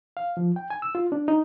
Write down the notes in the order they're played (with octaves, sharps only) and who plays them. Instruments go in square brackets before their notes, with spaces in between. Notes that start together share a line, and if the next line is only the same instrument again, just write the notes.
[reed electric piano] F5
F3
G5
G#5
E6
F4
D4
D#4